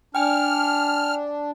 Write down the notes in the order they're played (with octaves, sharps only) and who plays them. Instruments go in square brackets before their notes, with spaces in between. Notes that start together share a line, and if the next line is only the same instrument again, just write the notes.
[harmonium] D4 [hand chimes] G5 G#5 [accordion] F6